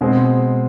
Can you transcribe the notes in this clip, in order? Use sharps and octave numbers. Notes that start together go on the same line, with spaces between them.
B2 G#3 C4